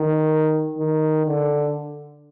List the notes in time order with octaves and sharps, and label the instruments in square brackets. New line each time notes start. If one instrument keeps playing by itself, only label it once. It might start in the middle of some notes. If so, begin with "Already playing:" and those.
Already playing: [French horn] D#3
D#3
D3